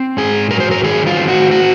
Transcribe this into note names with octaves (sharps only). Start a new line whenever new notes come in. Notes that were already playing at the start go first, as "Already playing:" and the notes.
Already playing: C4
G#2 G#4
F#3 A#4
C5
A#4
D#3 G#4
F4
C4
F#4
F#4